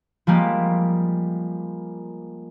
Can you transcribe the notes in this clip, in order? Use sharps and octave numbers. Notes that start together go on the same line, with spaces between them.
F3 G3 G#3 A#3 G4